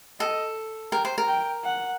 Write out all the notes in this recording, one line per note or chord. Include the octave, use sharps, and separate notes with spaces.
A4 D#5
A#4 G5
C5
A#4
G5
F#5